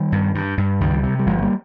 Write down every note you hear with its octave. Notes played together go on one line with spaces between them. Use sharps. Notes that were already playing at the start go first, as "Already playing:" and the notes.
Already playing: D#3 G3
G2
G2
G2
C#2 D#3 G3
C3
G3
G1 F3 G#3
G#3
G3 A#3